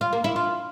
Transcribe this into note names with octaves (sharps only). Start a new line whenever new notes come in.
F4
A#3
E4
F4